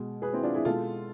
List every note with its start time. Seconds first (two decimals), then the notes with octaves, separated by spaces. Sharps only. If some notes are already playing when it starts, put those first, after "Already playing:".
Already playing: B2 G#3
0.22 G#4 B4
0.33 C4 E4
0.43 D4 F4
0.54 E4 G#4
0.65 B2 G#3 F4 A4